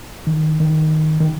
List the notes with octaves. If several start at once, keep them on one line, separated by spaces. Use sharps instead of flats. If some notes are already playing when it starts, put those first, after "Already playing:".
D#3
D#3
D#3